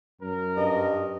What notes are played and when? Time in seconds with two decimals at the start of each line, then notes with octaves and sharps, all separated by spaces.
0.21 F#2 A#4
0.57 G2 D#5